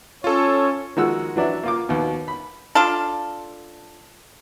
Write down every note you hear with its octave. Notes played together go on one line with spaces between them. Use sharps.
C#4 F4 A4 C#5
D#3 F3 G#3 F#4 E6
E3 F#3 D4 E4
A#3 F4 D6
D#2 B2
B5
D4 F4 A4